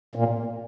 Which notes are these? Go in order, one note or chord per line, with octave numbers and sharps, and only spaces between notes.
A#2